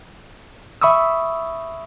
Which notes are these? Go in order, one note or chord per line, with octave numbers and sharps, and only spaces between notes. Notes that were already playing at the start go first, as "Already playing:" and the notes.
E5 B5 C#6 D#6 E6